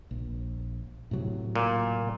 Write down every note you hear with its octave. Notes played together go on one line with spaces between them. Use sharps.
A#1
A2 C3 F#3
A#2